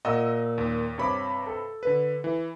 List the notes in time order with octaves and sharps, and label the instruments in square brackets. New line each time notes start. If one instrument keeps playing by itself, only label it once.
[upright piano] A#2 [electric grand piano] D#5 F#5 E6
[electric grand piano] D#2
[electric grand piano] G2 C3 B5 [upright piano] C#5 D6
[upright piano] A4
[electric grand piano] D3 B4
E3